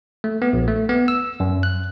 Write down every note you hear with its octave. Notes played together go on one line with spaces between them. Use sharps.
A3
B3
A#1
A3
B3
E6
F#2
F#6